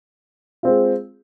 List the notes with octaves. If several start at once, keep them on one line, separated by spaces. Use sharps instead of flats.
G#3 C4 F4